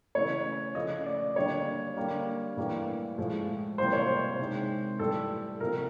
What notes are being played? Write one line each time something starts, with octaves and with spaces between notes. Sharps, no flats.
C#3 E3 A3 C#5
C#3 F3 A3 D#5
D5
D3 G3 A#3 C#5
D3 G3 A#3
A2 E3 G3 A#3
A2 F3 G#3
C3 E3 G3 A#3 C5
C#5
C5
C3 D#3 G#3
A2 E3 G3 A4
C3 F3 A3 A#4